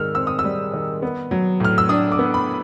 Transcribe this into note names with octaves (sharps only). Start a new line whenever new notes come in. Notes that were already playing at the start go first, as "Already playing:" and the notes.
Already playing: G#2 D#3 E6 F6
C4 E6
D#6
E6
G3
D#3
B3
F#3
A2 F6
E6
D4 D#6
D6
B3
B5